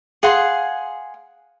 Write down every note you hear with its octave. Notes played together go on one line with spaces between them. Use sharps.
G#4 F5 F#5 C6